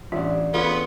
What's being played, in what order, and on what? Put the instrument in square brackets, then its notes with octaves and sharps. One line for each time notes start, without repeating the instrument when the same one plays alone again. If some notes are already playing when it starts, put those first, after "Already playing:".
[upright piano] A1 G3 D4 [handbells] F4 E5
[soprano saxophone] B3 [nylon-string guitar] F4 [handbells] G#4 A4 C#5